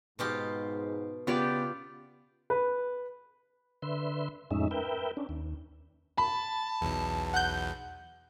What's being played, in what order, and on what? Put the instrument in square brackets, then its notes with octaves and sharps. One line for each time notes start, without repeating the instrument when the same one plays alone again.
[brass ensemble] G#2 [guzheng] B2 F4 G4
[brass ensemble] C#3 [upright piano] B3 [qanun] F4 G4 D5 [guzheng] C#5
[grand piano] B4
[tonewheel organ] D3 B4 E5 C6
F2 A2 G#3 C#4 D#4 E5
A#4 B4 E5 G5
C#4 D4
D#2
[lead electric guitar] A5 [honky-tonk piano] B5
[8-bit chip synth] B1 E2
[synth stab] F#5 F#6 G6